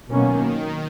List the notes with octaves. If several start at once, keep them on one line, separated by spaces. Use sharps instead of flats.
B2 D#3 F#3 A#3 C#4